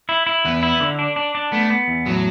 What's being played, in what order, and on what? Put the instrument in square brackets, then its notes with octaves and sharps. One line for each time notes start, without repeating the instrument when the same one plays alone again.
[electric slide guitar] E4
E4
[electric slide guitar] E2 [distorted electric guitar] B3
[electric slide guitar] E4
D3
D4
D4
D4
[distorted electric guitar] A3 [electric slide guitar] B3
[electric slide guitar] B3
E2
[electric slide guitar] A2 [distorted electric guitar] F#3